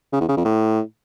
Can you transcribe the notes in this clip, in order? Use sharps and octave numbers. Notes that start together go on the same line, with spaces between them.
C#3
E2
C#3
F2
A2